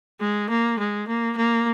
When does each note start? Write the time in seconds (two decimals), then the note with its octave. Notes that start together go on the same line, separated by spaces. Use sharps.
0.20 G#3
0.49 A#3
0.79 G#3
1.08 A#3
1.37 A#3